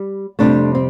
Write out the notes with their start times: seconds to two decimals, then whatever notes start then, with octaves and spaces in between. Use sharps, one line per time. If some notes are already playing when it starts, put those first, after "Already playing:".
Already playing: G3
0.39 F2 C3 G3 A3 D4
0.75 C4